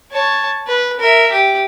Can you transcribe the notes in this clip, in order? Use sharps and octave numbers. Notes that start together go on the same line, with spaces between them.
C#5 A5
B4
A#4 E5
G4